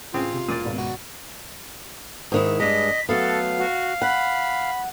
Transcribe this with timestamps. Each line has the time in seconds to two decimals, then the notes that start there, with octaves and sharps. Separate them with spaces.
0.14 A1 C#3 C4 F4 G#4
0.33 C3
0.48 E1 A#2 A6
0.65 G#1 C#2 B2
0.77 F#4
2.32 G#2 D#3 E4
2.60 G2 G#3 D#5 B6
3.09 F#3 A3 B3 A4 F5
3.58 F#4
4.02 F#5 B5